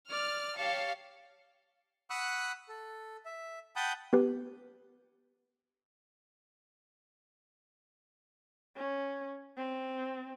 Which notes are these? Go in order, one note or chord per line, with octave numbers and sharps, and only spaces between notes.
D5 F6
G4 C#5 F5 A5 C#7
F#5 B5 C#6 D#6 E6 F#6
A4
E5
F#5 G5 A5 B5 D#6 G6
B3 G4 B4
C#4
C4